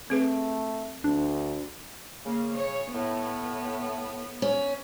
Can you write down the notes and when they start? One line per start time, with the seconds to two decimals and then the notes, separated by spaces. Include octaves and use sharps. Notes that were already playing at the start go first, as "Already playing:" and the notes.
0.10 A3 C4 G#4 B4
1.04 D2 D4
2.26 C#3 A#3
2.56 C#5
2.94 A2 B3
4.42 C#4